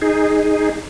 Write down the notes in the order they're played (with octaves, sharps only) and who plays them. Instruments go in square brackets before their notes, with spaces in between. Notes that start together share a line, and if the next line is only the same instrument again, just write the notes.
[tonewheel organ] D#4 G#4